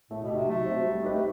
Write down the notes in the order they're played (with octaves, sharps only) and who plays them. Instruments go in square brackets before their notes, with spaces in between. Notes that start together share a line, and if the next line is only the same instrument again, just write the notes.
[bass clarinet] A2 [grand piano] A3
[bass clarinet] B2
[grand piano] G4
[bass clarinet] C3 [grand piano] D#4
[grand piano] F#3 [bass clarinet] A3
[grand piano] C4 F#4
G3
D#4 G4 B4
[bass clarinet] A3